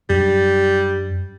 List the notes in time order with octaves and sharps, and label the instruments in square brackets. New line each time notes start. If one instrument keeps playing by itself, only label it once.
[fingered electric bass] F#2 D4 [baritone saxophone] G3